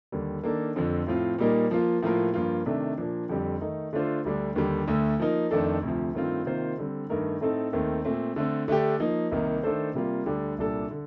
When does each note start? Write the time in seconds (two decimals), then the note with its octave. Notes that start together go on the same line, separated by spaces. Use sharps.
0.12 D#2 D3 G3
0.44 D#3 A#3 D4 A4
0.76 F2 D3 F3 C4
1.07 A2 F3 C4 F4
1.38 A#2 G3 A#3 D#4 A#4
1.71 F3 A#3 F4
2.03 A2 F3 A#3 F4 A#4
2.34 G2 F3 A#3 F4
2.66 C3 D#3 A3 D4
2.97 A#2 F3 A#3 D4
3.29 F2 D3 G3 C4 G4
3.61 D#3 A3 D#4
3.93 D3 A3 D4 F4 C5
4.25 D2 D3 G3 D4
4.56 D#2 D3 G3
4.87 D2 D3 A3
5.19 F3 A#3 D#4 A#4
5.51 F2 D#3 A3 D4 A4
5.83 D2 C3 F3
6.14 G2 D#3 A3 C4 F4
6.45 C3 D#3 A#3 F4 C5
6.78 D3 G3 C4
7.10 G2 D#3 A3 D#4 A#4
7.41 A2 A3 C4 D#4 A4
7.73 D#2 D#3 A3 C4
8.05 A#2 A3 C4
8.36 D3 A3 C4
8.68 D3 A3 D4 G4
9.00 F3 A#3 D#4
9.31 C2 C3 D#3 A#3 D#4
9.63 D#3 A3 D4 A4 C5
9.94 C3 G3 A#3 F4
10.26 D2 D3 G3 D4 G4
10.58 C2 A#2 G3 D4 A4
10.91 D3